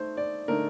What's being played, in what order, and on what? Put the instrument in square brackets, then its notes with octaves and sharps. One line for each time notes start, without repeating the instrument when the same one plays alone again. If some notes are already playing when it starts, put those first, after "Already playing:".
Already playing: [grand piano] A3 D#4 C5
D5
D3 A3 D#4 A#4